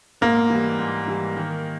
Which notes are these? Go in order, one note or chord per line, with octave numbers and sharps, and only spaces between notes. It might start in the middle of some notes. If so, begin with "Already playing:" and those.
G#2 A#3
E3 G3
G#2
E3 G3
D#3